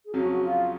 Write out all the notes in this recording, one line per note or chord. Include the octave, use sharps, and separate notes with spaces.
G#4
F2 C#3 F#3 C#4 F#4
F#4
F4